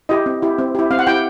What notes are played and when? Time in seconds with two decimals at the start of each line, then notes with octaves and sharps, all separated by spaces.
0.09 E4 G4 D#5
0.26 C4
0.42 E4 G4
0.58 C4
0.75 E4 G4
0.91 C4 F5
0.99 F#5
1.07 E4 G4 G5